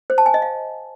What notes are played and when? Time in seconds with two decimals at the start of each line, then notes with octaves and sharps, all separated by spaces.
0.10 C5
0.18 A5
0.26 G#5
0.34 D#5
0.42 F5